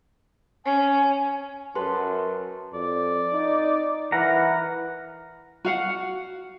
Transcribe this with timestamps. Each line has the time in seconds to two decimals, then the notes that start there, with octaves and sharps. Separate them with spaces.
0.65 C#4 G#5
1.75 F#2 A4 B4 C6
2.74 F2 D5
3.34 D#4
4.12 E3 A#4 B4 F#5 A#5
5.65 F#4 F5 F#5